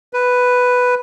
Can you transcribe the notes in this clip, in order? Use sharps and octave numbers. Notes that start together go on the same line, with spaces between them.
B4